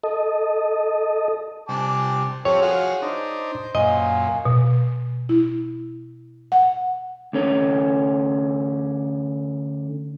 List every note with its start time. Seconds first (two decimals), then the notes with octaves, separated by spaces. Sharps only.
0.04 A4 D#5
1.69 C3 G3 G#5 A5 D6
2.45 F3 C4 G4 A4 C#5
2.62 F#4 G#4 F5
3.02 D4 D#4 C5
3.75 F#2 A#2 D#5 F5 G#5
4.45 B2
5.29 E4
6.52 F#5
7.33 D2 D3 C#4